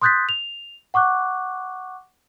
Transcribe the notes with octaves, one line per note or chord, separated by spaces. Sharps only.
C6 D#6 F#6 G6 A6 B6
F7
F#5 C#6 D6 F#6